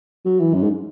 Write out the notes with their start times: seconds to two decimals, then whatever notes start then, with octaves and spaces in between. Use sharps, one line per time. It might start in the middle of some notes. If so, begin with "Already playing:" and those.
0.25 F#3
0.40 E3
0.54 F#2
0.63 G#2